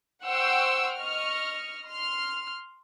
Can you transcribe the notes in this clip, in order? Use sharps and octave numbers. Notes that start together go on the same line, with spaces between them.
C5 F#5 G5 C6 C#6 E6
D#5 C#6 F6
C6 F6